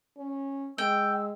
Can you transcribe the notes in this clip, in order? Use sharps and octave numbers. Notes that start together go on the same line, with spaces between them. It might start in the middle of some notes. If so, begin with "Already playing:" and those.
C#4
G#3 G5 E6